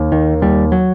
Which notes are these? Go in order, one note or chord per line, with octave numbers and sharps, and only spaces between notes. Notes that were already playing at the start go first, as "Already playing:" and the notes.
Already playing: D#2
D#3 A#3
D#2 G3
F#3